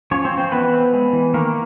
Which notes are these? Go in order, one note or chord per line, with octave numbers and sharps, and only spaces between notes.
F3 C#4 C#5
C4 C5
F3
C4 C5
E3 B3 B4
C4
G#3
E3
D#3 A#3 A#4